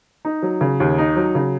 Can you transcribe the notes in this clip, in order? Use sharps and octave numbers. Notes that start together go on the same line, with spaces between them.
D#4
F#3
C#3
D#2
D#4
F#3
C#3